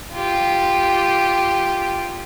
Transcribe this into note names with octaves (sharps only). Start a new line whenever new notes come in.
F4 G4